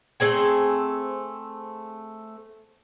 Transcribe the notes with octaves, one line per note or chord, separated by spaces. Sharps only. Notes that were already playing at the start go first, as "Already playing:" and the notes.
A3 C4 G#4 G#5